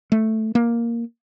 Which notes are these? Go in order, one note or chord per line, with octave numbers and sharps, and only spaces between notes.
A3
A#3